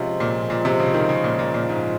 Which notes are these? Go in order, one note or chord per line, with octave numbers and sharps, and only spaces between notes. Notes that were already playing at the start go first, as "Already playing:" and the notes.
Already playing: C3 F3 G#3 C#4 F4
A#2
A#2
C3
C#3
D#3
C#3
A#2
A#2
A#2
G#2